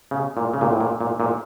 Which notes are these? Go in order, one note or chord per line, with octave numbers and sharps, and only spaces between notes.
C#3
A#2
C#3
A#2
A2
A#2
A#2
A#2